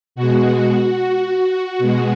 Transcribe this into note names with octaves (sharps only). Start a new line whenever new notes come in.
B2 F#4
G#3
B2 G#3